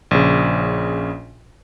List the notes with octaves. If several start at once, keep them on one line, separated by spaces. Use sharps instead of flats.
A#1 C#3